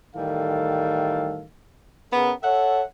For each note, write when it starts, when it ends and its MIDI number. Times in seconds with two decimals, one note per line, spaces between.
0.15 1.45 45
0.15 1.45 51
0.15 1.45 52
0.15 1.45 55
0.15 1.45 69
0.15 1.45 77
2.13 2.32 49
2.13 2.32 59
2.13 2.32 70
2.43 2.83 69
2.43 2.83 73
2.43 2.83 76
2.43 2.83 78